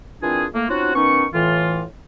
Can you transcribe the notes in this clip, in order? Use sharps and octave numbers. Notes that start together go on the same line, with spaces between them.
A#2 E3 C4 D4 F4 G#4
A3 A#3
C4 C#4 D#4 F4 F#4
D#3 B3 C#4 D#4 C#6
A2 E3 F4